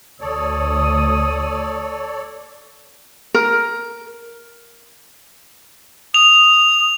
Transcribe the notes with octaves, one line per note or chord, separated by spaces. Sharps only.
D2 A4 C#5 D5 D#6
A#4
D#6 F7